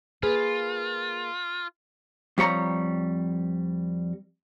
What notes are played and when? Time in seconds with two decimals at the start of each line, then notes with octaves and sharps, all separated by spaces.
0.23 A#3 F4 G#4 B4
2.38 F2 G3 C#5 A#5